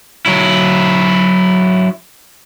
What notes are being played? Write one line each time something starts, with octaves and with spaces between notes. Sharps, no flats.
F#3 E4